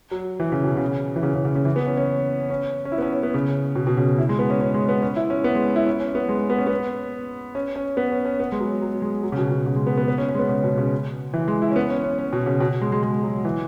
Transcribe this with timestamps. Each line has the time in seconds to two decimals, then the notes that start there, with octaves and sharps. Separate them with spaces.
0.11 F#3
0.40 E3
0.52 C#3
0.64 B2
0.77 C#3
1.16 E3
1.23 C#3
1.34 C#3
1.44 C#3
1.55 C#3
1.65 E3
1.76 B3
1.87 C#4
1.97 C#4
2.50 C#4
2.85 C#4
2.92 E4
2.98 B3
3.02 C#4
3.13 C#4
3.23 B3
3.34 C#3
3.75 B2
3.87 B2
3.97 C#3
4.18 E4
4.29 G#3
4.39 B3
4.50 C#4
4.61 C#4
4.74 G#3
4.89 B3
5.02 C#4
5.16 E4
5.30 C#4
5.44 B3
5.55 G#3
5.76 E4
5.86 C#4
6.00 C#4
6.15 B3
6.29 G#3
6.50 B3
6.59 C#4
6.67 B3
7.55 C#4
7.76 C#4
7.97 B3
8.12 C#4
8.25 C#4
8.40 B3
8.52 G#3
8.60 F#3
8.81 F#3
9.02 G#3
9.23 F#3
9.32 C#3
9.37 B2
9.51 B2
9.66 C#3
9.76 G#3
9.87 B3
9.97 B3
10.08 B3
10.18 C#4
10.29 C#4
10.35 G#3
10.39 B3
10.49 C#3
10.64 B2
10.78 C#3
11.34 E3
11.48 G#3
11.62 E4
11.71 C#4
11.76 B3
11.90 C#4
12.04 C#4
12.19 C#4
12.33 B2
12.46 C#3
12.60 B2
12.81 G#3
12.92 G#3
13.03 G#3
13.23 F#3
13.45 E3